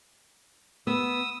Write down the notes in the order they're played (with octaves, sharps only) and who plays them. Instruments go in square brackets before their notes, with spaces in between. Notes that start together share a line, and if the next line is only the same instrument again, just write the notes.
[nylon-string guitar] B3 [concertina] D#6 E6